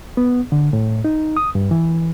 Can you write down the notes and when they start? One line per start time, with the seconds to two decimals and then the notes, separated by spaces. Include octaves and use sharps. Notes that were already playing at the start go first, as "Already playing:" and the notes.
0.17 B3
0.52 D3
0.73 A2
1.05 D#4
1.37 D#6
1.55 G2
1.71 E3